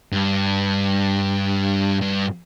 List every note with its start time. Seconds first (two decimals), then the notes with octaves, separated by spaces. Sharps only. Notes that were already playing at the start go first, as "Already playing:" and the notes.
0.12 G2
2.01 G2